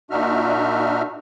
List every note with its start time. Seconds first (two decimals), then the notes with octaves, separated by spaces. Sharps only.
0.11 A#2 D4 D#4 F#4 E5 F6